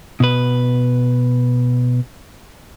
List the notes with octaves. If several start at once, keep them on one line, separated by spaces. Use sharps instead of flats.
B2 B4